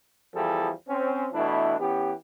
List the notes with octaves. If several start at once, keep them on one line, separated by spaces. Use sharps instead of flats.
E2 E3 F3 G3 G#4 A4
C4 C#4
B2 E3 A3 D4 E4
E3 B3 C#4 G4